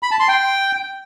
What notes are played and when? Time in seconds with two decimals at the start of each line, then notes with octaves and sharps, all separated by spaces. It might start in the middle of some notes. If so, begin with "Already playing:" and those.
0.03 B5
0.11 A5
0.20 C6
0.28 G5